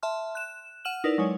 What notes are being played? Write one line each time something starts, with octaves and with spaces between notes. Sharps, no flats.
E5 A5 C6 F6
F#6 E7
F#5 F6 D#7 E7 F#7
D#4 E4 A#4 B4 D5
F#3 G#3 C#5